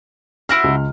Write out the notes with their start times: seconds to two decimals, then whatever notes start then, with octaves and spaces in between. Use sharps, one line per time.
0.49 E4 F#4 C5 F6
0.64 C#2 C#3